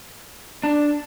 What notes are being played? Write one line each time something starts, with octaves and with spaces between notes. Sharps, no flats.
D4